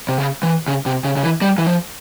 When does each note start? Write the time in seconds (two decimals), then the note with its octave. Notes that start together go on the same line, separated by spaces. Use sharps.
0.09 C3
0.18 C#3
0.43 E3
0.68 C#3
0.86 C3
1.04 C#3
1.17 C#3
1.23 E3
1.41 G3
1.58 E3
1.66 F3